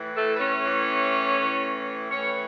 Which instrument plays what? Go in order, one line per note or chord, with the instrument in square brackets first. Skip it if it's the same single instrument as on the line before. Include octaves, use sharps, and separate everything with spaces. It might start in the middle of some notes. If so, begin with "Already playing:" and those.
Already playing: [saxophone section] A2 E3
A3 A4
B4
C#4 C#5
A2 E3
A2 E3
A2 E3 C#4 C#5